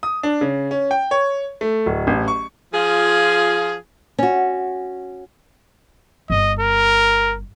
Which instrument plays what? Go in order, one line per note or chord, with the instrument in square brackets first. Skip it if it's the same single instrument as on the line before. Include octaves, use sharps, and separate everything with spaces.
[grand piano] D#6
D4
C#3
C#4
G5
C#5
A3
D1
A1
C#6
[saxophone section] F3 F4 G#4
[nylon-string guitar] C#4 F#4
[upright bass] G1 [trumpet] D#5
[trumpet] A#4